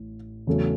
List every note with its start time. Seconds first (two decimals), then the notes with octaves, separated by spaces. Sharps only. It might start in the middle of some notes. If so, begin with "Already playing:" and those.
Already playing: A1 A2
0.47 E2 C#3 F#3 A3